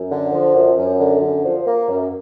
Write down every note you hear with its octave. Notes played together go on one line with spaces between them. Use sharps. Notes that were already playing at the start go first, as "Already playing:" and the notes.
Already playing: F#2
D3
F3
F#2
F#2
D3
F#2
F3
A#3
F#2